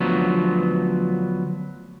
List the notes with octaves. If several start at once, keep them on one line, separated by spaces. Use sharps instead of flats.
D2 F3 F#3 B3